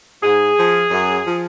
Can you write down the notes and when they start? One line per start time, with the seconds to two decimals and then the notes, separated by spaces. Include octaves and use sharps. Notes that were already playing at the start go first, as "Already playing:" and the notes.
0.23 G#2 G#4
0.58 F3
0.91 F#2
1.25 F3